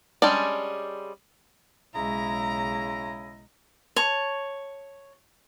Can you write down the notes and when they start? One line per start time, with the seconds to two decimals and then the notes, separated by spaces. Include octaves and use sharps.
0.22 G3 G#3 C#4 D4 D5
1.94 B1 C#3 G#3 E4 D#5 A#5
3.96 C#5 A5